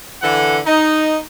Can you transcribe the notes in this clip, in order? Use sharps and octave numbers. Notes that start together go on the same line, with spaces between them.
D3 E3 A4 F#5
D#4